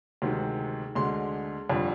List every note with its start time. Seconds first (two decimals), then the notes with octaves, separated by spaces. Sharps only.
0.22 D2 C3 D#3 G#3
0.95 D2 D3 G#3 C6
1.70 F2 D3 G3